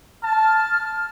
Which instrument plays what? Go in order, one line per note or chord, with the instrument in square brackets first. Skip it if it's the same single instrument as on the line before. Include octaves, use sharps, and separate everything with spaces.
[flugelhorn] A5 [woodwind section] F6